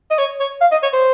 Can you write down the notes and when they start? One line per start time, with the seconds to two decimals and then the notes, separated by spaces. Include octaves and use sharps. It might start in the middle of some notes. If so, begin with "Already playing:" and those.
0.10 D#5
0.18 C#5
0.40 C#5
0.61 F5
0.71 D#5
0.83 C#5
0.93 C5